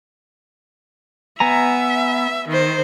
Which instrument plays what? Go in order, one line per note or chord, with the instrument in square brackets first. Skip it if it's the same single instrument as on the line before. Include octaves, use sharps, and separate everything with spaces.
[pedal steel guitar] B3 G#5 A#5 [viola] E5
[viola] D#3 C5